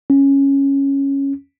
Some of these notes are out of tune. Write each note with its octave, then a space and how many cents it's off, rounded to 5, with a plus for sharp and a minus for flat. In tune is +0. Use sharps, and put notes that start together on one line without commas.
C#4 -5